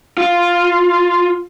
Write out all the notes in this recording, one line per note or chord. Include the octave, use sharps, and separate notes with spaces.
F4